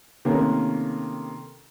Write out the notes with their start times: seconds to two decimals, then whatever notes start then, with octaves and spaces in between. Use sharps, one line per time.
0.25 C3 D#3 A3 A#3 C#4